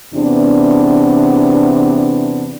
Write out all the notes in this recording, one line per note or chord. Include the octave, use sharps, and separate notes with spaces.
E2 C3 B3 D4